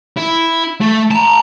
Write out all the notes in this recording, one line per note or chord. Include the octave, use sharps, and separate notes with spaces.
E4
A3
A5 A#5